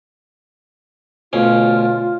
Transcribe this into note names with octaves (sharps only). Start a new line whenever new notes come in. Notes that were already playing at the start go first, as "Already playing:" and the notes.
D2 B2 C#4 F4